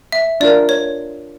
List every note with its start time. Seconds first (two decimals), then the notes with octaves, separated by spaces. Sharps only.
0.12 E5
0.40 D4 F4 A#4 D5
0.69 C#5